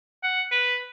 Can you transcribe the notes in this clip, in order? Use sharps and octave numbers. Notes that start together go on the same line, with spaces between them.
F#5
B4